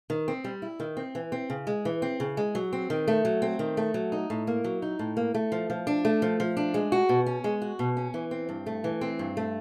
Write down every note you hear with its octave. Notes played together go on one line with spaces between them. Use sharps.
D#3
C4
G3
E4
D#3
C4
E3
C4
C#3
G#3
E3
C4
C#3
G#3
F#3
C4
D#3
A3
F#3
C4
D#3
A3
F#3
D#4
A2
A#3
F#3
D#4
A2
A#3
A3
F3
F3
D4
A3
F3
F3
D4
G#3
F#4
B2
C#4
G#3
F#4
B2
C#4
E3
C4
G2
A3
E3
C4
G2
A3